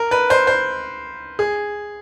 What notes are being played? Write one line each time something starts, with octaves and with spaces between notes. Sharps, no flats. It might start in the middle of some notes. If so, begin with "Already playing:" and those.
Already playing: A#4
B4
C5
C5
G#4